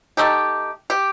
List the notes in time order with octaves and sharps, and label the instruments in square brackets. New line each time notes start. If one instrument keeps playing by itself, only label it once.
[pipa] A3 D#4 G4
G4